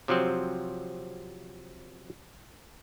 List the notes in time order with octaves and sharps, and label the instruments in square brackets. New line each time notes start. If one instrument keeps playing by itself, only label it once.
[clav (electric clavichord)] C3 F3 F#3 C4